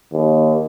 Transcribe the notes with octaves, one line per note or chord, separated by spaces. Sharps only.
D#2